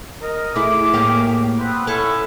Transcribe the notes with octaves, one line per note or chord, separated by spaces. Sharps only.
A#4 D#5
A3 E4 G#4 D6
A2 A#3 G4
B3 C4 B4
B3 C#4 E4 A4